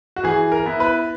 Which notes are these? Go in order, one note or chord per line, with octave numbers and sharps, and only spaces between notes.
F#4
E3 G#4
A#4
B3 E4
B4